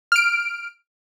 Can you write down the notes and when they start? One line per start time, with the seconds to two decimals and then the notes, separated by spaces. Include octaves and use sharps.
0.12 F6 D7